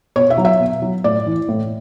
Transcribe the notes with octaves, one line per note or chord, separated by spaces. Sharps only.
B2 C#5
E5
F#3
E5
B2
F#3
A2 D5
E3
A2